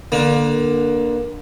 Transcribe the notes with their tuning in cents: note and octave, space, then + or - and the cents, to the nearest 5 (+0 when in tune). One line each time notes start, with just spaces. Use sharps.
D3 +10 A#3 +30